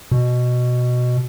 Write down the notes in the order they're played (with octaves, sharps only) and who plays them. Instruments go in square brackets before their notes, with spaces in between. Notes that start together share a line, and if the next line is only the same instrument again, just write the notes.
[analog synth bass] B2